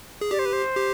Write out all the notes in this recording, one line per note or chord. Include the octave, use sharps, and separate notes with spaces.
G#4
G4 D5
C5
B4
C5
G4